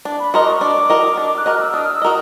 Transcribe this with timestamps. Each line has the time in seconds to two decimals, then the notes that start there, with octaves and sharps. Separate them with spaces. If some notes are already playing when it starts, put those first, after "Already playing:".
0.05 D4
0.20 B5
0.34 F#4 A#4 D#5 C6
0.42 D6
0.47 C#6
0.61 D4 D6
0.90 F#4 A#4 D#5
1.17 D4
1.38 F#6
1.46 F#4 A#4 D#5 F6
1.62 E6
1.74 D4 D#6
1.84 F6
1.92 E6
2.02 F#4 A#4 D#5 D#6